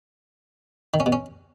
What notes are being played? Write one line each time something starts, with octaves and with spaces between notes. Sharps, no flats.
D#3
C#4
B2
C#4